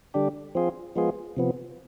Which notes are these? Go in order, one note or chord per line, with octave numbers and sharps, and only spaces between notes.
D3 G3 D4 G4
F3 C4 F4 G#4
F3 G#3 B3 F4 G#4
C3 F3 B3